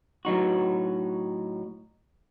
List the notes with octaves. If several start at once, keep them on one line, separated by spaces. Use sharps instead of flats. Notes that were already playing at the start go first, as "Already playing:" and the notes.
A2 F#3 D#4 F#4